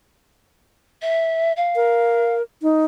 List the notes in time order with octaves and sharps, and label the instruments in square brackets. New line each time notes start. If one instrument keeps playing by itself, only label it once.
[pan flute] E5
F5
[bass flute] A#4
D#4